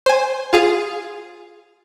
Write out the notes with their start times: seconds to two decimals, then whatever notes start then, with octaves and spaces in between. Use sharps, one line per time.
0.06 C5 G#5
0.53 F4 G#4 F5